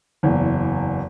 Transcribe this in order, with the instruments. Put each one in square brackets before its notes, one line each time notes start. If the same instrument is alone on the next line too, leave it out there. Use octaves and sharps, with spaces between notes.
[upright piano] F#1 E2